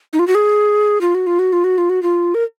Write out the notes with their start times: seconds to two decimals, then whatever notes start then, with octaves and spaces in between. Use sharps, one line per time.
0.13 D#4
0.19 F4
0.28 F#4
0.35 G#4
1.01 F4
1.15 F#4
1.27 F4
1.39 F#4
1.53 F4
1.64 F#4
1.78 F4
1.90 F#4
2.03 F4
2.35 A#4